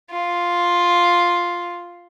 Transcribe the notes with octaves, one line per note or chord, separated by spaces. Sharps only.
F4